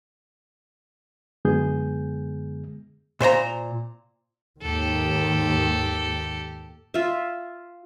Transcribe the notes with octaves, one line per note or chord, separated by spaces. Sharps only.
F#2 D3 G#3 B3 G#4 G6
A#2 C5 C#5 A#5
D#2 G#2 D#3 G4 A4
F4 E5